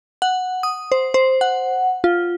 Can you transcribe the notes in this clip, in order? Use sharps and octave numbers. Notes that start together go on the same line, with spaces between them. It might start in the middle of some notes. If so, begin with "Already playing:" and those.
F#5
D#6
C5
C5
F#5
F4